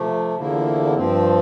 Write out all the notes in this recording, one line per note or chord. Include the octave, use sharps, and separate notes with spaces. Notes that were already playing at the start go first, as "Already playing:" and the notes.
Already playing: C3 F3 A3
E2 D3 F3 A#3 E4
G2 F3 C4